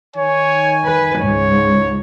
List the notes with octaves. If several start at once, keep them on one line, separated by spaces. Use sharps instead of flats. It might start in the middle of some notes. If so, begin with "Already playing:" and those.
D#3 C#5 G#5
B4
C#2 G#2 C#5